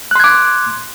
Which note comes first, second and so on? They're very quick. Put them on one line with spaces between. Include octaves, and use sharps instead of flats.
F#6 C6 G#6 D6